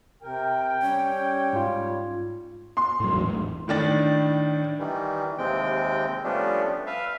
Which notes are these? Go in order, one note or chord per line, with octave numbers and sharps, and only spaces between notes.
C3 A#4 G5
G3 C#4 C#5
G#2 F4
C6
A2 F#3
G#1 E2 A2
A2 D#3 D4 A6
D#3 E3 G3
D#2 C3 G#3 C4 G5
F3 G3 A3 B3 C#4 D4
B4 E5 F5